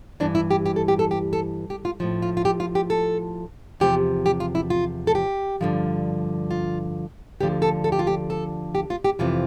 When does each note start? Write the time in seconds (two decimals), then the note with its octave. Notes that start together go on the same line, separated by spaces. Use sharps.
0.20 G2 E3 D4
0.35 E4
0.51 G4
0.66 G4
0.76 A4
0.88 G4
0.99 A4
1.11 G4
1.33 A4
1.70 G4
1.85 F4
2.00 A2 F3
2.22 F4
2.37 F4
2.45 G4
2.60 F4
2.75 G4
2.90 A4
3.80 E2 C3 F3 G4
4.26 G4
4.40 F4
4.55 E4
4.70 F4
5.07 A4
5.15 G4
5.61 G2 D3 F3
6.51 F4
7.40 D2 D3 F3 G4
7.62 A4
7.84 A4
7.92 G4
7.99 F4
8.07 G4
8.30 A4
8.75 G4
8.90 F4
9.04 G4
9.19 F2 C3 E3 F4